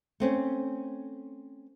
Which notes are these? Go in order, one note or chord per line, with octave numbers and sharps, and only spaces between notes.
A3 C4 C#4